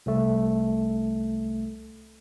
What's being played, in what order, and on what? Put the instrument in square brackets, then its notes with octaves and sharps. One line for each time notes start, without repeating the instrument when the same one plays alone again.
[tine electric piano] C2 A3